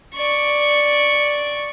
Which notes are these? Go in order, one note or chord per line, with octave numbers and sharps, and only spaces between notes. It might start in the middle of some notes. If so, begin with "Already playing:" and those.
D5 C#6